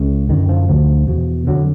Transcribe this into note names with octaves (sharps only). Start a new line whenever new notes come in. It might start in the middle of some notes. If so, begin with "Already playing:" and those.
Already playing: C#2 C#3
F#2 D3 D#3
F3
D2 D3 F3
E2 B2
F2 D3 F#3